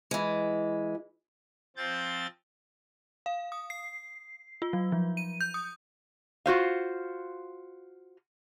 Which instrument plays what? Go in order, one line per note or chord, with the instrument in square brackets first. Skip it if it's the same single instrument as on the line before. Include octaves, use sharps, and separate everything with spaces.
[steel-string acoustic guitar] E3 G#3
[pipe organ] F3 C4 G6 A6
[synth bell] F5
D#6
C7
F4
F#3
F3
D#7
G6
D#6
[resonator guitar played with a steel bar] F4 F#4 C5 F5